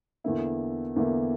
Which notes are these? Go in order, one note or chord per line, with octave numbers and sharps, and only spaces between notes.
E2 D3 A#3 E4
E2 D3 A#3 E4